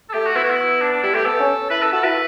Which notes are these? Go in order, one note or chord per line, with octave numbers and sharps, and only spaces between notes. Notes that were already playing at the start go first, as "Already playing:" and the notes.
A4
A3 G4
F#4
B3 E4
F#4
E4
D4
D4
G3 E4
A3 G4
B3 A4
C#4
E4 B4
A4
F#4 A4
E4 B4